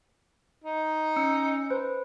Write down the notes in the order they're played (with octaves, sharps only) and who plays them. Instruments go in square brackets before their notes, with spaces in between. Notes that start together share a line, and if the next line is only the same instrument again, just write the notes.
[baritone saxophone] D#4
[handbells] C#4 E6 C#7
B4 C5